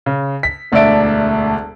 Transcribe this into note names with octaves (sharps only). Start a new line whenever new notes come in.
C#3
B6
E1 D2 D4 D5 E5 D7